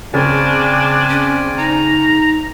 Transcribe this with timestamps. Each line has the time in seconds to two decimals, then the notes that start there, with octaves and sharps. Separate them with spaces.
0.14 C#3 C4 D4 D5 G#5
1.10 C#4
1.58 D#4 A#5